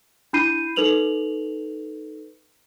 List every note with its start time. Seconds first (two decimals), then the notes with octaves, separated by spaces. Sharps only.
0.33 D4 E4 B5 G6 C7 D#7
0.76 D#4 A4 B4 F7 F#7